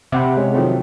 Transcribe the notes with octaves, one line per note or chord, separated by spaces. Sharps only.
C3 E5 F#5 B5
G#3 C#4
D#3 F3 F#3 A3 C4